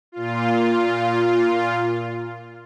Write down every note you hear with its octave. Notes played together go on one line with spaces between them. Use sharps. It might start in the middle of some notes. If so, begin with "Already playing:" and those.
A#2 F4